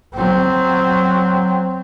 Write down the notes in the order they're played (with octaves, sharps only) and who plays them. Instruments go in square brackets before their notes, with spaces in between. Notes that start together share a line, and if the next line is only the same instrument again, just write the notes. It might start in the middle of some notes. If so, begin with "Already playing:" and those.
[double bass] F#3 C4